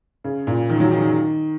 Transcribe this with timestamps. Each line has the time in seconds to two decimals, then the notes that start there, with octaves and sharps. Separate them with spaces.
0.24 C#3
0.47 A#2
0.69 D#3
0.80 F#3
0.91 D#3
1.02 D#3